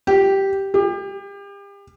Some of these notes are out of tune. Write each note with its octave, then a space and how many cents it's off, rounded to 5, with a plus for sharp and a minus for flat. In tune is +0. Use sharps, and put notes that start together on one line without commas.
G4 -5
G4 +35